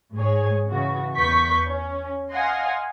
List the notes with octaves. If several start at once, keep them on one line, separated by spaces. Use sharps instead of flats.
G#2 G#4 C#5
C#3 E3 F#4
E2 B3 B4 C#6 G6 B6
C#4
D#5 F5 F#5 G#5 C6